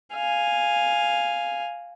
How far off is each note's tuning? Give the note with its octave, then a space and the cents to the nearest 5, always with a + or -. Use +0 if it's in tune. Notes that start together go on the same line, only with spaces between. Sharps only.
F5 +0 G#5 -5